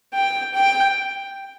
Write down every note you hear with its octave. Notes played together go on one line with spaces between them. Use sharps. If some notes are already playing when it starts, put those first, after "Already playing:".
G5
G5